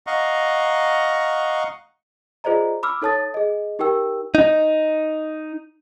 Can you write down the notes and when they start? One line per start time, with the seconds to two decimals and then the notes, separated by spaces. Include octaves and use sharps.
0.07 D#5 F5 F#5 A#5 C#6
2.44 F4 G#4 C5 D5 D#5 A#5
2.83 B5 D6 E6 F6
3.02 D#4 A4 C#5 A5 D#6 A6
3.34 G#4 D#5
3.79 D#4 G4 A#4 G5 E6
4.35 D#4